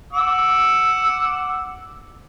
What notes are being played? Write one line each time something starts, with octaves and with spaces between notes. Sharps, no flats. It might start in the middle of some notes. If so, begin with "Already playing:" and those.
F#5 D6 E6